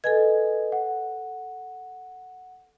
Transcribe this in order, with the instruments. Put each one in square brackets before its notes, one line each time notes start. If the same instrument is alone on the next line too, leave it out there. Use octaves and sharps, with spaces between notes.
[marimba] A4 G#5 G#6 [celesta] B4 D#5
[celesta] F#5